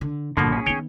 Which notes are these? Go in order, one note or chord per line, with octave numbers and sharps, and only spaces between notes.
D3
A#1 G2 B2 D3 F3 A#3
C#4 G#4
D#3 B3 C#5 G5